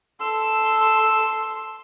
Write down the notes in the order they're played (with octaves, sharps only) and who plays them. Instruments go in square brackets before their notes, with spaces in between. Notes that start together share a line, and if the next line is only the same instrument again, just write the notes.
[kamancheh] A4 C6 [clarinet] E6